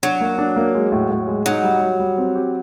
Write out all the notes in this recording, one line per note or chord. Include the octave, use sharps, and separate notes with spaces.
F#3 D4
A#3
D4
A#3
G#3
A2
A2
G#3
F#3 D#4
G3
G3
G3
C4
G4